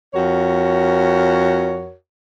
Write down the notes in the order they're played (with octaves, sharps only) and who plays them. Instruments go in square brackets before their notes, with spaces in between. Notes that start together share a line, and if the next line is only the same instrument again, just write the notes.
[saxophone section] F2 F#4 A#4 C#5